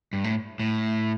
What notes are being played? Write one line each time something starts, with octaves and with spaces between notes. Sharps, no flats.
G2
A2
A2